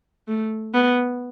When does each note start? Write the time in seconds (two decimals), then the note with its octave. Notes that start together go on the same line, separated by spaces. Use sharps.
0.28 A3
0.74 B3